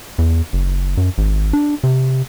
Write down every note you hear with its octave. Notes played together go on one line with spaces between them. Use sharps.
E2
F#1
F#2
G#1
D4
C3